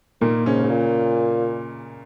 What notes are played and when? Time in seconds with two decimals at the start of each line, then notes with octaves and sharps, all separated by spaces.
0.21 A#2 D#3 A#3
0.46 G#2 C#3 C#4
0.64 G#2
0.70 A#2